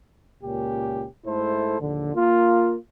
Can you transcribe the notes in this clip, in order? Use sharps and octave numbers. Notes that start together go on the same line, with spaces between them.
C#2 A#2 A#3 C#4 G4
G#2 A3 E4 A4 C5
A#1 D#2 D3
A#3 F4